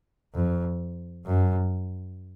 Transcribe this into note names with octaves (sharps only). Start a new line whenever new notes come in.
F2
F#2